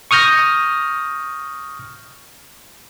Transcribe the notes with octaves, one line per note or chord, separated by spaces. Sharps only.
C#6 D#6 F6 G6 A#6